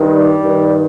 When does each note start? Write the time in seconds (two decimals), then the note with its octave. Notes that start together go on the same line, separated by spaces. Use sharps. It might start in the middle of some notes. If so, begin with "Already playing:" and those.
Already playing: G2 D#3
0.12 G3
0.42 G2 D#3